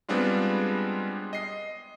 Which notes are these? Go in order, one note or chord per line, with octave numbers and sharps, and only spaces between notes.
G3 G#3 B3 C4 D4 F4
D#5 C7